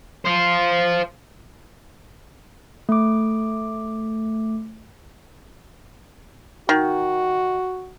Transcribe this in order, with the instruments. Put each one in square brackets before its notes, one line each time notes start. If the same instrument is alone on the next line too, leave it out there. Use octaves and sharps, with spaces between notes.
[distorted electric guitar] C5 F5
[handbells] A3 D6
[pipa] D#3 [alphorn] F#4